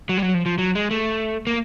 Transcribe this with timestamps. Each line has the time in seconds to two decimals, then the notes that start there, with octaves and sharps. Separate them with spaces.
0.09 F#3
0.17 G3
0.22 F#3
0.34 F3
0.46 F3
0.58 F#3
0.75 G#3
0.91 A3
1.47 A#3